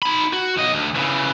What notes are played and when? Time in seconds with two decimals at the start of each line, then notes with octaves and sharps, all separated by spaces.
0.02 D#4 B5
0.33 F#4
0.57 B1 D#5
0.73 D2
0.95 C#3 E3